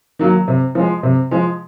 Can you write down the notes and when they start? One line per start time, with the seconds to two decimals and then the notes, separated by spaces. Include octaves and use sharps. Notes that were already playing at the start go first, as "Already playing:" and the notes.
0.19 D#3 F#3 A#3
0.48 C3
0.75 F3 G#3
1.03 C3
1.31 F3 G#3